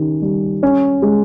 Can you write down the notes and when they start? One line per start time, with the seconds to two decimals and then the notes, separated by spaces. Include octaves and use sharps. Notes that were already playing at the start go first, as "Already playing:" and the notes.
Already playing: D#3 C#4 G4
0.22 G3
0.63 C#4
1.02 G#3